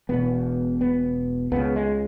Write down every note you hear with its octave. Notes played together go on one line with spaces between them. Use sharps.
E1 E2 B2 B3
B3
C#2 C#3 B3
G#3